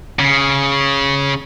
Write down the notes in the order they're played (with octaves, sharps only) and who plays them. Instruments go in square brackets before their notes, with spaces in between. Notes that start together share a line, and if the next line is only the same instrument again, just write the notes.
[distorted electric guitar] C#3